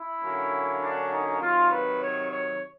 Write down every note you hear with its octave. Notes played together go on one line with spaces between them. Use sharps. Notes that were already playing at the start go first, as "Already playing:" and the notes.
Already playing: E4
D3 F#3 A#3 C#4
D4
D#4
C3 D#3 F#3 F4
B4
C#5
C#5